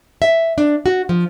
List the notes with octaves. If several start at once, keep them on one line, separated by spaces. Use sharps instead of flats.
E5
D4
F#4
F3